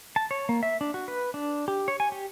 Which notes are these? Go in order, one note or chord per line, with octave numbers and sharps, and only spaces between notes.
A5
C#5
A#3
E5
D4
F#4
B4
D4
G4
C#5
G#5
G4